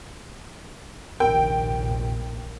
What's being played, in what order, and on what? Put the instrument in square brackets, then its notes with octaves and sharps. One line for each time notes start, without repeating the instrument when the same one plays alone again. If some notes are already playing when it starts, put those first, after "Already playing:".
[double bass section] F1 A#1 D#2 [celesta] A#4 [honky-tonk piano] G5